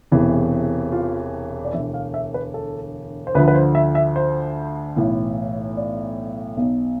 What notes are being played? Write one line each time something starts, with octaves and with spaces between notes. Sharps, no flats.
E1 E2 C3 E3
F4
D5
E1 D2 D3 E5
F5
E5
B4
A4
C5
D2 D3 F3 B4
B4
C5
E5
E5
C5
B1 A2 E3
D5
B1 B2